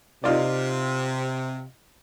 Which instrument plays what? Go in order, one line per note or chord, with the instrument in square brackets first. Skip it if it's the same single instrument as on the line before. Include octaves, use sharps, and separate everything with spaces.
[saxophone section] C3 [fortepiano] D#4 F4 D5